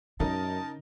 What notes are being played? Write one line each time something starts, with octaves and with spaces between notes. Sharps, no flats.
F#2 C#3 D#4 A#4 D#5 A5